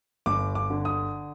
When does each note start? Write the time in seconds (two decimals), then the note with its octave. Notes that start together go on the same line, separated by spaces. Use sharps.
0.26 G1 D6
0.55 D6
0.70 D3
0.85 D#6